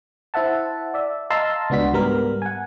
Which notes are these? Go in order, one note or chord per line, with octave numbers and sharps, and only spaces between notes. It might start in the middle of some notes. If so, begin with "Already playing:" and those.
E4 C5 E5 F#5 A5
D5 E5
D#5 F5 A5 A#5 C6 E6
C#2 B3 D4 F#4 B6
G#2 G3 B3 A#4
F#5 G#5